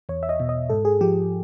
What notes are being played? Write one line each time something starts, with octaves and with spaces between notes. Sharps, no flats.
E2 C#5
E5
D#5
B2
D#5
G#2 A4
G#4
F3 G4